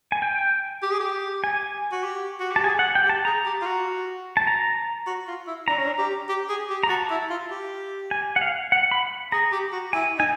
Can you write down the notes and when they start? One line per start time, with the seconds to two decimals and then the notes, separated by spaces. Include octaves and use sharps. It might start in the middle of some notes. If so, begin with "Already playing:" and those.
0.12 G#5
0.22 G5
0.83 G4
0.91 G#4
1.00 G4
1.44 G#5
1.92 F#4
2.04 G4
2.40 F#4
2.51 G4 A5
2.64 G#4 G#5
2.79 F#5
2.95 G5
3.05 G4
3.09 A5
3.25 G#4 A#5
3.46 G4
3.61 F4
3.66 F#4
4.37 A5
4.47 A#5
5.07 F#4
5.28 F4
5.47 E4
5.68 D4 A#5
5.78 C#4
5.86 D4
5.98 G4
6.29 G4
6.49 G#4
6.70 G4
6.83 A#5
6.89 F#4 A5
7.10 E4
7.30 F4
7.50 G4
8.11 G#5
8.36 F#5
8.41 F5
8.72 F#5
8.91 B5
9.32 G#4 A#5
9.52 G4
9.72 F#4
9.93 E4 G#5
10.18 D#4 G#5